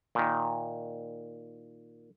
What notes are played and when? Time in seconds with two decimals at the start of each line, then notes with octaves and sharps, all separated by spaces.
0.15 A#2 D#3